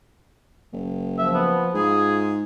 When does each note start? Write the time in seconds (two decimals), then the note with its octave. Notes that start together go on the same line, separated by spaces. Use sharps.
0.73 F#1
1.18 F3 E5
1.35 B3
1.75 G#2 F4 G#4